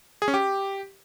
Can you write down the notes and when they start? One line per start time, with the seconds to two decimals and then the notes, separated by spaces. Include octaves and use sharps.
0.22 G#4
0.28 C#4
0.34 G4